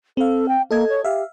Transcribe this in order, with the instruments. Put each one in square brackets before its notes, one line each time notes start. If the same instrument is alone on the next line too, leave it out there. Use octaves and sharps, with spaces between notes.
[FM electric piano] C4 F5 [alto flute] A4
[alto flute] G5
[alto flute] A#3 [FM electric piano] A4 D#5 G#6
[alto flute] C#5
[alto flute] G4 [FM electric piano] E5 F5